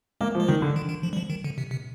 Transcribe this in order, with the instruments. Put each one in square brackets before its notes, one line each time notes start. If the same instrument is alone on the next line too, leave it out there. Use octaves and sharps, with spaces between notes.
[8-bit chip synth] G#3 [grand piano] A#3
[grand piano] F3
[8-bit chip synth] G#3
[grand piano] D#3 [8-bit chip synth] G3
[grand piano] D3
[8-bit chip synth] D#3
D#3
F3
G3
F3
D#3
D3
C3
C3